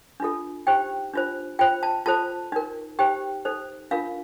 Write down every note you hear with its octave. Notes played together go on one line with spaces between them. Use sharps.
D4 F4 A4
D#4 G4 C5 G5
D4 F4 C5
F4 C5 G5
A5
F4 A4 C5 A5
D#4 A#4
D#4 G4 C5 G5
D#4 A4 C5
D4 F4 A#4 F5